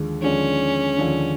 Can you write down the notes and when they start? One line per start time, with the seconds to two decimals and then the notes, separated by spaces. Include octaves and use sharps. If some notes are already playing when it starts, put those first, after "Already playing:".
Already playing: D#2 D3 F3 G#3
0.22 D#2 D3 F3 G#3 C#4
0.98 D#2 D3 F3 G#3